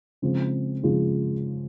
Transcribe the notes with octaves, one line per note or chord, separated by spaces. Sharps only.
C#3 F3 G#3 C4 F4
C#3 F3 G#3 C4 F4